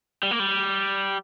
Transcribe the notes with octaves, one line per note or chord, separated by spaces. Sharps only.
G3
A#3
G3